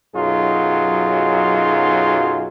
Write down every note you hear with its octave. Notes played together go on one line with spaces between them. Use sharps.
B1 F#2 F#3 D#4 F4 G#4